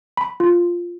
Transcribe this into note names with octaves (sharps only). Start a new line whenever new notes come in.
B5
F4